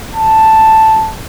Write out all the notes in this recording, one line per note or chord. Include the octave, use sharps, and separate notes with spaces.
A5